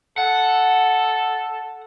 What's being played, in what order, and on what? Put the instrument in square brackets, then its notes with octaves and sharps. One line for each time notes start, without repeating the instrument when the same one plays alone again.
[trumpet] A4 [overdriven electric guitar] F#5